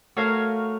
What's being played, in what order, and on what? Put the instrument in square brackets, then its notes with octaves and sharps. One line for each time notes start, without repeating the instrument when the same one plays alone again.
[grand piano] A3 [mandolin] F#4 A#4 C#5 F5